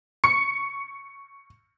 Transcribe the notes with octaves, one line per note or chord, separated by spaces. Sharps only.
C#6 C#7